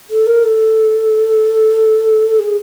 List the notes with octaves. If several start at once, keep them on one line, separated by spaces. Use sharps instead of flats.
A4
A#4
A4
G#4